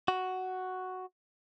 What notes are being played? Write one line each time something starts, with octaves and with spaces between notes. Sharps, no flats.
F#4